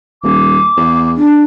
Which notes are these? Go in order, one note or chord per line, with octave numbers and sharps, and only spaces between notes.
D#1 D6
E2
D4